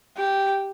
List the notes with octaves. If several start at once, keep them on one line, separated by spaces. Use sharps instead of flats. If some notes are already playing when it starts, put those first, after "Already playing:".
G4